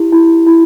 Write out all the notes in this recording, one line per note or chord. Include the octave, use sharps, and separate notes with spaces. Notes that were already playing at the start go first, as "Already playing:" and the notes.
Already playing: E4 G4
E4
E4